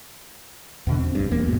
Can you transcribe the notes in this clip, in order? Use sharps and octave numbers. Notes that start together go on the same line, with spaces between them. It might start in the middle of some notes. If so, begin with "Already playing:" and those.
E2 B2 D3
C4
A#1 G2
D#1 E2 A#3
A1 G#2 B2